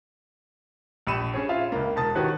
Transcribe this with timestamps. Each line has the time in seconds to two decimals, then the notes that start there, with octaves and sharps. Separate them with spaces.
1.07 A#1 G4 B5 C#7 D#7 E7
1.34 C#4 G#4 C#5
1.49 F4 E5 F5
1.72 C#2 A#3
1.96 E1 A#4 A5 D#6 A6
2.15 D#3 F#4 G4 B4 C#5